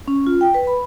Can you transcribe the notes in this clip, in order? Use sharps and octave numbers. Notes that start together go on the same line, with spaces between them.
C#4
F4
G5
B4
B5